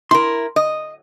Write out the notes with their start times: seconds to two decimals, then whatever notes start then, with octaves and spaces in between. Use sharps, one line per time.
0.11 E4 A#4 C6
0.56 D#5